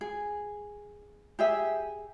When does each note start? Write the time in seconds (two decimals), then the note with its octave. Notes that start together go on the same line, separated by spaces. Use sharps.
0.01 G#4
1.39 G4 G#4 E5